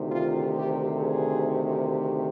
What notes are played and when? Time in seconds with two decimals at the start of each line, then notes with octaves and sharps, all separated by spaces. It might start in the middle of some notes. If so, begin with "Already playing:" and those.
Already playing: D2 C3 D#3
0.11 F4
0.55 G4
0.99 G#4